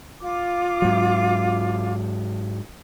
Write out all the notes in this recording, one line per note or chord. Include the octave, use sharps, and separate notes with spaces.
F4 D6
G#2 F#3